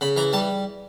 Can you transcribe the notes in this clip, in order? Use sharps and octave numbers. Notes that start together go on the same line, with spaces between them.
C#3 B5
E3 A#5
G3 A5